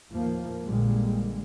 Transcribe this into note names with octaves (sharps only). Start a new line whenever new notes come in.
D#2 A2 F3 A#3
A#1 A#2 D3 G3 G#3